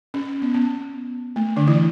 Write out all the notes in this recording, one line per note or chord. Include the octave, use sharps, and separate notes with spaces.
C#4
B3
B3
A3
D3 D4
E3 E4